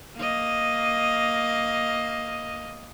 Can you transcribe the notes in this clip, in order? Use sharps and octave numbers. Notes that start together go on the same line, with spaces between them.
A#3 D#5